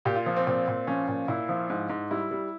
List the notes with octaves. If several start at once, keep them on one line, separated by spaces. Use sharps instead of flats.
A#2 G4
F4
F3
C4
A#2 C4
A#2
F3 C#4
A#2
A#2 E4
F3
G#2
G#2
G3 E4
G3